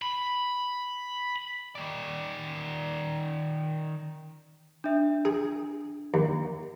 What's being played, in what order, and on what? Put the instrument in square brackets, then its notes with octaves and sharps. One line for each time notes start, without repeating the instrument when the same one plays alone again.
[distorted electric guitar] B5
[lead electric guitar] D#3 D5
[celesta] D4 E5
[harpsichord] G#4
D#2